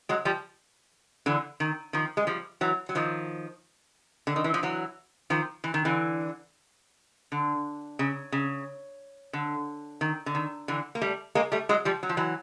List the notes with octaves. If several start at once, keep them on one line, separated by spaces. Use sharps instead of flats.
F#3 G#3
F3 G3
D3 E3
D#3
D#3 F3
G#3
F3 G3
E3 F#3
F#3
D#3 F3
D3
D#3
E3
F3
E3 F#3
D#3 F3
E3
D#3
D3 E3
D3
C#3
C#3
D3
D#3
D3
D#3
D3 E3
A#3
G3 A3
G#3 A#3
G3 A3
F#3 G#3
F3 G3
F#3
F3
E3 F#3